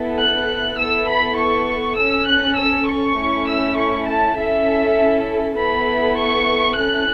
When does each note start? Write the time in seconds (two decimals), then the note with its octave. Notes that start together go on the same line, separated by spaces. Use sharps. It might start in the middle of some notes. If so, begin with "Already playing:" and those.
Already playing: B3 E4 A4
0.18 F#6
0.77 B3 E4 A4 E6
1.08 B5
1.38 C#6
1.97 C#4 A4 E6
2.28 F#6
2.58 E6
2.88 C#6
3.18 A3 C#4 E4
3.48 E6
3.78 C#6
4.08 A5
4.38 C#4 E4 A4 E5
5.58 B3 E4 A4 B5
6.18 C#6
6.77 C#4 E4 A4 F#6